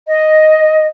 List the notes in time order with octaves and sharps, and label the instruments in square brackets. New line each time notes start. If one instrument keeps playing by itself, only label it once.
[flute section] D#5